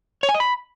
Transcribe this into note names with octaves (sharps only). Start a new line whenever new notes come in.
C#5
G#5
D#5
B5